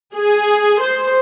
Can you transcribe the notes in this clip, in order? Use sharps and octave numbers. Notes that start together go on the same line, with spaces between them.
G#4
C5